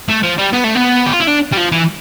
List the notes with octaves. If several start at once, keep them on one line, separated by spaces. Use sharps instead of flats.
A3
F3
G3
B3
A3
B3
G4
F4
E4
D4
G3
F3
E3